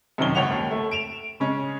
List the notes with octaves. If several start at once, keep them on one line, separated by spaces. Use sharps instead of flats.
F#2 C3 D#3 C#4 G7
C#2 C#5 F#5 F7
D#2
A3
D7 E7 F7
C#3 G#3 C#4